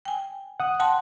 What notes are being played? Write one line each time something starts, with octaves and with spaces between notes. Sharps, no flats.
G5 G#5
F#5 D#6
F#5 G5 A5 C6